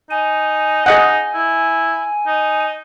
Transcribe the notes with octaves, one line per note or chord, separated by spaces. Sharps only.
D#4 G#5
D#4 G#4 D#5 F#5
E4
D#4